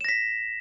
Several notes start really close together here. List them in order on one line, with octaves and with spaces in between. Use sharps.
E7 A#6 B6